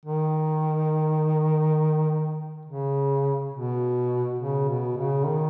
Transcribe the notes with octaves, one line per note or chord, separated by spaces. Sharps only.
D#3
C#3
B2
C#3
B2
C#3
D#3